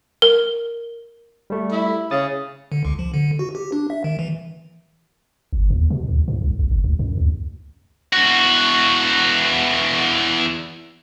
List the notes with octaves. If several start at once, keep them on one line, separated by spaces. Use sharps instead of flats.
A#4
G3 A3
E4
C#3 D#6 A6
D3
C#2
F3
D3
F#4
G4
D4
E5
D#3
E3
G1
D#2
B2
D2
G#2
C2
A#1
G1
C#2
F#2
D2
E2 F#4